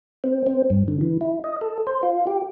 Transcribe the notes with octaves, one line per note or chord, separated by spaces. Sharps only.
C4
C4
G2
D3
E3
E4
D#5
A4
C5
F4
G4